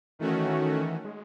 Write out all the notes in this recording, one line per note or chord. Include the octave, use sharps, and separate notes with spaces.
D#3 E3 A3 C#4 F#4
G#3